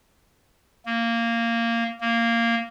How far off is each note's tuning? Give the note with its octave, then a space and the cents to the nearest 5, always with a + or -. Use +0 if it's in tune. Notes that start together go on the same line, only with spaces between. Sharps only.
A#3 -15
A#3 -10